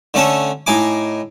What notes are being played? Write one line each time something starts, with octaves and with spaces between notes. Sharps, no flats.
D3 A3 C#4 A4
A2 D#4 G#5 D6